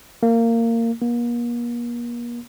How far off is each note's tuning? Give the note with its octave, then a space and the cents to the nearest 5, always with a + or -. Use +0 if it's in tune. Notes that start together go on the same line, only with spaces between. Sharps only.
A#3 -20
A#3 +40